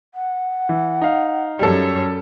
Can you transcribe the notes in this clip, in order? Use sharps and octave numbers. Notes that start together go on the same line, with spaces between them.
F#5
E3
D#4 F5
F#2 G3 A4 C#5